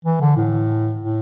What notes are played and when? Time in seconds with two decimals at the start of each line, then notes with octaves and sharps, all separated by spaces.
0.05 E3
0.21 D3
0.37 A2
1.01 A2